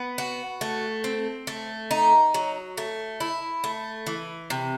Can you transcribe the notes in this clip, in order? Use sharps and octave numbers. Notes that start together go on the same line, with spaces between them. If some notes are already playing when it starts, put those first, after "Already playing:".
Already playing: B3
F#4
A3
C4
A3
D#4
F#3
A3
E4
A3
E3
C3